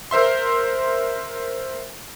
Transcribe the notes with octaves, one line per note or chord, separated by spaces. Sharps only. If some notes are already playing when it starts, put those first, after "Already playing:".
A#4 C5 E5 C6